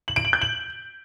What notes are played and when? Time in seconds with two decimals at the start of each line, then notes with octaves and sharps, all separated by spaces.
0.08 F#7
0.16 D7
0.25 F#7
0.33 G6
0.42 F#7